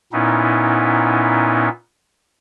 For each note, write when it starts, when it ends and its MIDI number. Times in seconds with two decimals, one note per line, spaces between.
0.13 1.69 46
0.13 1.69 59
0.13 1.69 61
0.13 1.69 63
0.13 1.69 64